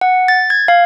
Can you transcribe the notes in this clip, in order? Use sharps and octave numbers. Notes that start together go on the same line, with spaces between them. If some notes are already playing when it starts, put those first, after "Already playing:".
F#5
A6
G#6
F5